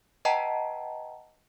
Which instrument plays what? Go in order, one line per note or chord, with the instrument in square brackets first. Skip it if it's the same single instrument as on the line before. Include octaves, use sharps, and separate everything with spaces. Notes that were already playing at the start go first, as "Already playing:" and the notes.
[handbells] B4 D#5 F#5 G5 A5 A#5